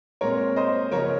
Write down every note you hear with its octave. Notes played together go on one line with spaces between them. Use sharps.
A#2 G#3 C4 A#4 C#5
C5 D#5
C#3 F3 A#3 C#4 A#4 C#5